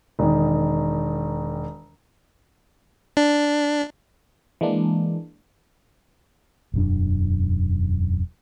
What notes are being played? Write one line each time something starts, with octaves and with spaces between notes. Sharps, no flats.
E1 D#3
D4
E3 G#3 A#3 D4
E1 F#2 D4